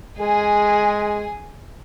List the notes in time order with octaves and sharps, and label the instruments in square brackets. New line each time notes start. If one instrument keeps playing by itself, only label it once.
[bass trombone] G#3 [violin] G#4 G#5